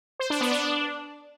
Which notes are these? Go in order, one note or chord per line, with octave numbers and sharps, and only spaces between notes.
C5
D4
B3
D4